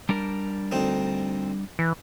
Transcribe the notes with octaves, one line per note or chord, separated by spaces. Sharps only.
G3 D4 A#4
D2 C4 D#4
E3